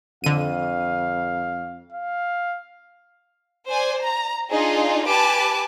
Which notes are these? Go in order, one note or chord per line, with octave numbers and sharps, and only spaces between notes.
F2 D3 F5 D#7
F5
C5 D5 G#5
A#5
D4 D#4 F4 G#4
G4 B4 G#5 A5 D6